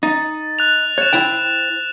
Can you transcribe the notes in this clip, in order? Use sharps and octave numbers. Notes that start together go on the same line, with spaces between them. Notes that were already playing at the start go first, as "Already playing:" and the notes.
D#4 A6
F#6 F7
C#5 F#6 E7
E4 C5 G5